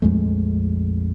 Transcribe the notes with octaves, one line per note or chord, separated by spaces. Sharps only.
A#1 F2 G#3 A3